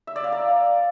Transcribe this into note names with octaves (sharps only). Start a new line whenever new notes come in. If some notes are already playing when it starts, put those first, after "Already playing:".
E5
D5
F5
A#5